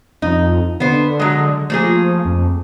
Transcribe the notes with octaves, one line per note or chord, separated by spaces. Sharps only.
F2 D#4
D3 B3 C5
F#3 G#3
F3 A3 A#3 G#4
F2